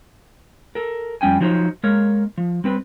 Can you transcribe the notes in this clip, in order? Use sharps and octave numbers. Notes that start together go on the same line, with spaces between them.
A4 A#4
F2 G3 C#4 G5 G#5
F3 F#3 D#4 C5 C#5
G#3 A#3 A#4 C#5
F3
G3 C4 B4